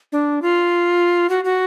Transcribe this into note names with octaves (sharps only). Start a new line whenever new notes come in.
D4
F4
F#4
F#4